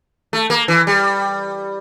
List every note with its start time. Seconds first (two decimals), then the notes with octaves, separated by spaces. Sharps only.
0.33 A3
0.50 A#3
0.68 E3
0.87 G3